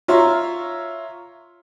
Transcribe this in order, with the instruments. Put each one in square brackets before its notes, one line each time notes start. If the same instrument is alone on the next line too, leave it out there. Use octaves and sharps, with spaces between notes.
[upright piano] F4 C#5 E5 A#5 C6 F6